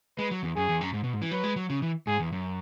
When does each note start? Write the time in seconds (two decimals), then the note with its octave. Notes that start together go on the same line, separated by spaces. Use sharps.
0.18 G#3 B4
0.31 F#3
0.43 E2
0.56 F#2 G#4
0.69 E2
0.81 F#2
0.94 G#2
1.04 B2
1.13 G#2
1.22 E3
1.31 F#3 B4
1.44 G#3
1.56 F#3
1.70 C#3
1.82 E3
2.07 G#2 G#4
2.20 E2
2.32 F#2